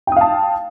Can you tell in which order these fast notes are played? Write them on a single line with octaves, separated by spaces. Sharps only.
G5 D#6 F5 A5